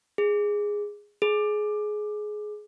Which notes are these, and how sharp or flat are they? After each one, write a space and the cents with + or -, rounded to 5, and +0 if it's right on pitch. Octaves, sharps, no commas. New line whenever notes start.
G#4 -5
G#4 +20